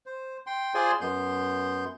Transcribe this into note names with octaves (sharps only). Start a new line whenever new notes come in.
C5
G5 C6
F4 G#4 C5 D5 G#5 C6
F#2 B3 C6 G6